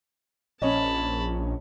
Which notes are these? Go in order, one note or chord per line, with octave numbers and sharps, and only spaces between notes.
A#1 C#4 C#5 D#5 A5 B5